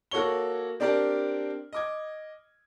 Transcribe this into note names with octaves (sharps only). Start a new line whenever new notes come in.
A#3 F#4 A4 C#5 C#6 G7
C4 D4 G4 A#4 D5
D#5 D6 G#6